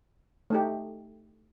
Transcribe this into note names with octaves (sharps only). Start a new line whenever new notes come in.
A3 D#4 G4